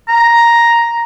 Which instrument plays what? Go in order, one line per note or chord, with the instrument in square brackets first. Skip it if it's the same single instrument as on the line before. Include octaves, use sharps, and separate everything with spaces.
[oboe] A#5